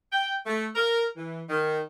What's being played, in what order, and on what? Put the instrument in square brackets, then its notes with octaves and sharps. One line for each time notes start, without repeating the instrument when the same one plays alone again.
[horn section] G5
A3
A#4
E3
D#3